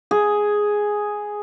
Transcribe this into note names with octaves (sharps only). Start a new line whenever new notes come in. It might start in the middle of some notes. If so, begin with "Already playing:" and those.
G#4